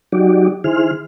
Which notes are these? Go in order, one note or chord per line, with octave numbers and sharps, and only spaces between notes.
F#3 D#4 F#4 G4 D5
D#3 E4 G#4 C5 F6